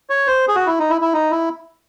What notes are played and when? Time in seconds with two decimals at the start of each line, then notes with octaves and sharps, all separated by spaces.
0.10 C#5
0.27 C5
0.48 G#4
0.55 F#4
0.67 E4
0.79 D#4
0.90 E4
1.01 E4
1.14 D#4
1.31 E4